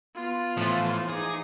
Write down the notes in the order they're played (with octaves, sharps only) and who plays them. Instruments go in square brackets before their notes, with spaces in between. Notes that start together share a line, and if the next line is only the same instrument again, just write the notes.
[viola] B3 F4
[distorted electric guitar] A2 [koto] E3 F3
[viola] D#4 D6 [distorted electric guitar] G#4